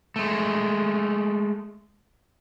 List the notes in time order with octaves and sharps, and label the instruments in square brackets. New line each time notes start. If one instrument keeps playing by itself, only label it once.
[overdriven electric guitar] G#3 A3